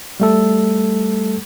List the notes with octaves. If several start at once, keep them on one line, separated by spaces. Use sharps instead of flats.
G3 A3 A4